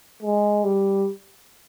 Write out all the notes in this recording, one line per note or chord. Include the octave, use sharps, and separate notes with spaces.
G#3
G3